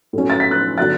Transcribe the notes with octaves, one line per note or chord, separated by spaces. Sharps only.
A2 F#3 C#4
A6
B6
F#6 A6
D3 F#3 B3 D4 F#6 A6